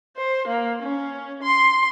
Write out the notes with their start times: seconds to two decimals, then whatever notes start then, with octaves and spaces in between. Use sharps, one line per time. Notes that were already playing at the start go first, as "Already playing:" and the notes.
0.16 C5
0.47 A#3
0.82 C#4
1.43 C6